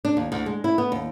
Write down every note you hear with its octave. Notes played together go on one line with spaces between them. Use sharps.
D4
D#2
D2
G#3
E4
B3
D#2